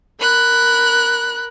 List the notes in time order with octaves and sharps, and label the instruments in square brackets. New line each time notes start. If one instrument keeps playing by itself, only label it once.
[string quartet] A#4 B5 F#6